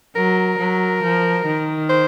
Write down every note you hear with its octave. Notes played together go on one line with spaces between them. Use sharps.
F#3 A#4
F#3
F3
D#3
C5